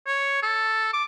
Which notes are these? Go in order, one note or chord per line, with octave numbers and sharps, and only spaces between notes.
C#5
A4
D6